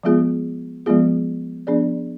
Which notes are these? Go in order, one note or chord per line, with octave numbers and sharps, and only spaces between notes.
F3 G#3 B3 F4 G#4
F3 G#3 B3 F4 G#4
F3 B3 D4 G#4 D5